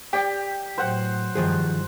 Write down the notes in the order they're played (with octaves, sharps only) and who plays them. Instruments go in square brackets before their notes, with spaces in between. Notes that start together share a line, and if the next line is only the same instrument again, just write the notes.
[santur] G4 [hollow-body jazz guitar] D5 G5
[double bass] A2 F#3 [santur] C5 F#5
[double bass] G2 [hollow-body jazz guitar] D#3 F3 G#4